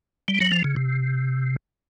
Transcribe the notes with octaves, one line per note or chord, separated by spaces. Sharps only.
G3
F#3
F3
C#3
C3